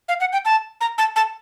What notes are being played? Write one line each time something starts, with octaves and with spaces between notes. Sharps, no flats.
F5
F#5
G5
A5
A#5
A5
A5